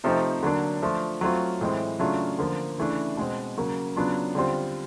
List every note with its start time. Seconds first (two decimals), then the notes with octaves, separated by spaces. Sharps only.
0.04 C3 F3 A3 C4 D#4
0.43 D3 F#3 A#3 D4
0.82 F3 A3 D4 F4
1.21 F#3 A3 C4 F4
1.61 A2 E3 G#3 C4
1.99 C#3 F#3 A3 D4 F4
2.39 D3 F3 A#3
2.78 C#3 E3 A3 D4
3.17 B2 G#3 C4
3.57 C#3 F#3 A#3
3.96 C#3 F#3 B3 D4 F4
4.35 D3 G3 C4 F4